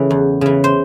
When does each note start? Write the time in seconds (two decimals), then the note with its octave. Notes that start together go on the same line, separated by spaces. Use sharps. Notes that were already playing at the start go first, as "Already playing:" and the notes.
Already playing: C#3 E3 A4
0.11 E2
0.41 C#3 E3
0.64 C5